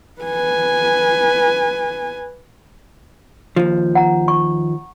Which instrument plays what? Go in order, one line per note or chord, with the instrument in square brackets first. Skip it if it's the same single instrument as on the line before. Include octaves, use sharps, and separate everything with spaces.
[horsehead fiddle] B4 G#5
[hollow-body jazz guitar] D#2 F3
[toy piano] F#5 A#5
C#6